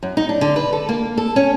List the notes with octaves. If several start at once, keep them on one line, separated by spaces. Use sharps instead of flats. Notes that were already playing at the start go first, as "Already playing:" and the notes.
F#2
D#4
D4
D3
B4
A4
A#3
A4
C#4